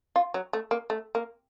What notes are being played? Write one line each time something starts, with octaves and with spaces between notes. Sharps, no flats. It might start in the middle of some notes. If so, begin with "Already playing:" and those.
F4
F#3
A3
A#3
A3
A#3